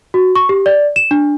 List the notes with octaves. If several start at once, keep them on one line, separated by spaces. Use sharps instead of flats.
F#4
C#6
G4
D5
E7
D4